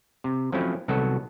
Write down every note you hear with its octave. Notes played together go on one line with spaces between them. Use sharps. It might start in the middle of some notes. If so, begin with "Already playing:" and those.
C3
F3 F#3 A3 C4 C#4 E4
C2 D#3 F#3 B3 F#4 A4